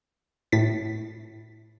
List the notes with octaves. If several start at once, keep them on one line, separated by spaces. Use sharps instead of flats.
A2 A6 B6